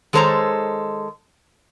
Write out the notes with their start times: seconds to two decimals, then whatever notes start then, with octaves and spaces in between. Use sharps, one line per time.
0.13 D#3 G#3 A4 C5 C#5 A#5